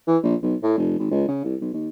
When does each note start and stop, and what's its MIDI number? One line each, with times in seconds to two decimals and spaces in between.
0.07 0.17 52
0.23 0.35 34
0.42 0.55 35
0.63 0.77 45
0.77 0.98 29
0.99 1.09 32
1.11 1.26 37
1.28 1.43 49
1.44 1.56 36
1.61 1.69 35
1.73 1.89 39